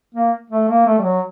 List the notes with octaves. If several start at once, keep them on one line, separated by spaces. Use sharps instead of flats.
A#3
A3
A#3
A3
G3
F#3